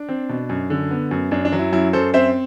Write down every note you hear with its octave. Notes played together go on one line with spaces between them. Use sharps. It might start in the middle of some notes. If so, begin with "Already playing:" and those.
Already playing: D4
C4
B2
F#2
D3
B3
F#2
F#2 D4
D4
F#3
E4
F#2 E4
F#2 A4 C5
C4 C5 E5